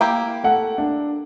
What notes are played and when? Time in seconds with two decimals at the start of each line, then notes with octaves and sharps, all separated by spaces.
0.01 A#3 E4 G4
0.44 A3 F#5
0.78 D4